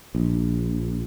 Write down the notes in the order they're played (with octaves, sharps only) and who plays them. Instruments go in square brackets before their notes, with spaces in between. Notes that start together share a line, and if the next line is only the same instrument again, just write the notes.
[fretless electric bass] A#1